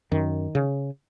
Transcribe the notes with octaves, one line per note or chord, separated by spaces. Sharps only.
F#2 D#3
C#3